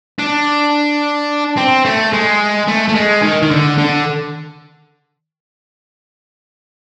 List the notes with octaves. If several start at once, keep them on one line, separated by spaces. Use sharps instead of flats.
D4
C4
A3
G#3
A3
A3
G#3
D#3
D#3
D3
D3